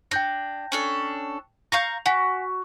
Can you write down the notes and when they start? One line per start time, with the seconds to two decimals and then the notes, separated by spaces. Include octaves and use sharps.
0.11 D4 G5 G6 A#6
0.72 C#4 D4 A4
1.72 F5 A#5 C#6 G6 A#6
2.06 F#4 F#5 G#5 B6